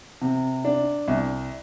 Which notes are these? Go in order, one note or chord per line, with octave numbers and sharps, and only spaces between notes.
C3
D4
C2